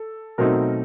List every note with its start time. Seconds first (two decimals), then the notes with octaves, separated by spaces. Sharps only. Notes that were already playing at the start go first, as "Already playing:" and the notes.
Already playing: A4
0.38 B2 F#3 A3 C4 D#4 A#4